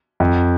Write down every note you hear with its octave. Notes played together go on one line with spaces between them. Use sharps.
F2